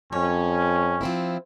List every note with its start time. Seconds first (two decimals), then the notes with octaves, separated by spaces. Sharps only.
0.13 F2 C#4 C#5
1.01 F3 C4 E4